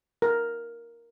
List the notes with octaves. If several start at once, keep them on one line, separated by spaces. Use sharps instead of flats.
A#4